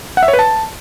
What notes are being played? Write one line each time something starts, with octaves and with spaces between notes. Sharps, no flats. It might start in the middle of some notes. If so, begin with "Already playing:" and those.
F#5
E5
C#5
B4
A5